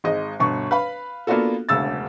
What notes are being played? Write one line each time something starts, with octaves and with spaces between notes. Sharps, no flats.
G#1 G#3 D#5
G1 B2 C#6
B4 F5 B5
A#3 B3 D4 F4 F#4 A4
E1 D2 C#3 E6 A6